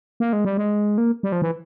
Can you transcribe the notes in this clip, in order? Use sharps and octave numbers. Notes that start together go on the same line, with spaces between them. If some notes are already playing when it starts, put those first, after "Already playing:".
A#3
G#3
G3
G#3
A#3
G3
F3
E3